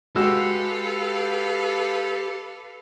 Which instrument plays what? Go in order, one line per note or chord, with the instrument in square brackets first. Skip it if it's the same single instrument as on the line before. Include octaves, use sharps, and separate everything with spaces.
[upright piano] G#3 F#4 [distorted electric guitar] G4 [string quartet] A4 B4 F5 [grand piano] E6